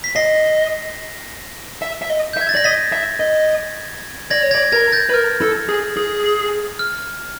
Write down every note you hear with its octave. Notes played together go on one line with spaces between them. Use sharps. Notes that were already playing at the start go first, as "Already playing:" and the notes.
B6
D#5 A#6 C7
E5
E5
D#5
G6
E5
G#6
A6
D5 A#6
D#5 A6 B6
E5
D#5
D5 G#6 A#6
C#5
D5 G#6 A#6
A#4 G#6 A#6
G6 A6
B4
A#4 F6
A4
G#4
G#4
F6